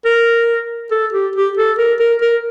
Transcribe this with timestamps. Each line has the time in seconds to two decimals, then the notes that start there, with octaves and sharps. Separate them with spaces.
0.05 A#4
0.91 A4
1.13 G4
1.36 G4
1.57 A4
1.78 A#4
2.00 A#4
2.22 A#4